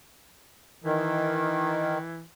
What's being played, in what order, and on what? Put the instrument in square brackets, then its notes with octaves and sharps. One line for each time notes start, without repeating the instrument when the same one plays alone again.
[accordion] D#3 [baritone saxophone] E3